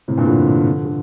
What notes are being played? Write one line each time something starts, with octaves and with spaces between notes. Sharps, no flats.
A2 C3
G2 A#2
D3 F3
D3